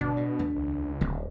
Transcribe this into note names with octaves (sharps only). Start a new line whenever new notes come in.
G1 B2 D4
A2
D#2 A3
C#2
D#1 D3 G3 C4